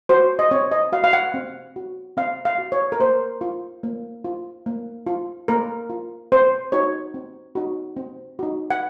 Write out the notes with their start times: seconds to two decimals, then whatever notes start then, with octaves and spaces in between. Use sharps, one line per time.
0.09 F#4 C5
0.39 D#5
0.51 C4 C#5
0.72 D#5
0.92 F#4 F5
1.04 F5
1.13 F#5
1.34 C4
1.76 F#4
2.17 C4 F5
2.45 F5
2.58 F#4
2.72 C#5
2.92 A#4
3.00 A#3 C5
3.41 F4
3.83 A#3
4.24 F4
4.66 A#3
5.07 F4
5.48 A#3 A#4
5.90 F4
6.32 C4 C5
6.72 D#4 F#4 C#5
7.14 C4
7.55 D#4 F#4
7.96 C4
8.39 D#4 F#4
8.70 F#5